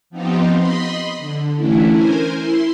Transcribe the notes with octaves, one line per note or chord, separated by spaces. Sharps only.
F3 B3 C4 D#4 F4 G4
D#5 B5 C6
D3
E3 A3 C#4 D4 E4
A#4 C5 G#5
E4 C6